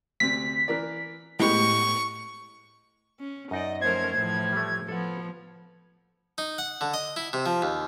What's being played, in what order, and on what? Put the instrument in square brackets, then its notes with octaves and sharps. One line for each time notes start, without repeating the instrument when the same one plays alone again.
[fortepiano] D2 C3 [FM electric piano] B6
[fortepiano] E3 A#4 D5
[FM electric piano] A2 [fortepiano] G#3 B3 G4 [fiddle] C#6
[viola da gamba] C#4
[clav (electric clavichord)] F#2 D#4 D5 [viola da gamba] D#5
[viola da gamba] F3 A3 A#4 [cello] C#4 C5 [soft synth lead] G#6
[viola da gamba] A2 F3 [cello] E3
[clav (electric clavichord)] G3 A3
[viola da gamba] F3 [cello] B3 [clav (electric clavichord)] A4 F#5
[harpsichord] D#4
F#5
D3
D#5
E4
C3
F3
D#2